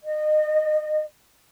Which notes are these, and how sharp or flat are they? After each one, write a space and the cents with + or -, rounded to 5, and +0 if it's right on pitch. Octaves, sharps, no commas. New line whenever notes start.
D#5 -30